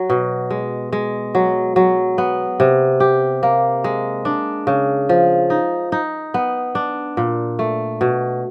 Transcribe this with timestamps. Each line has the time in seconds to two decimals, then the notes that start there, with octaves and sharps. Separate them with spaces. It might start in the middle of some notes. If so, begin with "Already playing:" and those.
Already playing: F#3
0.10 B2
0.51 G#3
0.93 G#3
1.35 F#3
1.76 F#3
2.18 B3
2.60 C3
3.00 G4
3.43 A#3
3.84 G#3
4.25 D4
4.67 C#3
5.09 F3
5.50 D#4
5.92 D#4
6.34 B3
6.75 D4
7.17 A#2
7.59 A3
8.01 B2